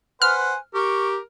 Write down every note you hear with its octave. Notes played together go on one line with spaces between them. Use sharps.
B4 C5 F#5 G#5 F6
G4 A#4 C#6